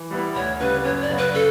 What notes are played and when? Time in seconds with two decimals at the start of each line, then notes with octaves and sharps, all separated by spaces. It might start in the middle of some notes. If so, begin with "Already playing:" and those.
Already playing: E3
0.11 G3 B3 E4 B4
0.36 D2 C#5
0.60 C#3 G3 B4
0.84 F#2 C#5
1.01 D5
1.09 C#3 F#3 B3 F#4
1.17 B4
1.34 C#3 A4